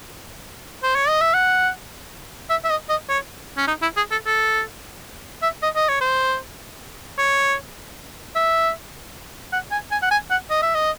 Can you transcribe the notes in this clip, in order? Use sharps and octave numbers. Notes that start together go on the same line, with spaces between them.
C5
C#5
D#5
E5
F#5
E5
E5
D#5
D#5
C#5
C#4
D#4
E4
G#4
A4
A4
E5
D#5
D#5
C#5
C5
C#5
E5
F#5
G#5
G#5
F#5
G#5
F#5
D#5
E5
D#5